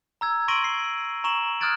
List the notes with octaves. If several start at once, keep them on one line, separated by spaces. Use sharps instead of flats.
A#5 E6 G#6
C6 C#6 A#6 D7 D#7 F#7
C7
A#5 C#6 E7 F#7
D#6 F6 F#6 G#6 A6 D7